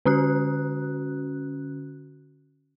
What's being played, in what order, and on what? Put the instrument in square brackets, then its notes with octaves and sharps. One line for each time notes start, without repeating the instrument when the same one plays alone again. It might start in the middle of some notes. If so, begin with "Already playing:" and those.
[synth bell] D3 C#4 F#4 F#6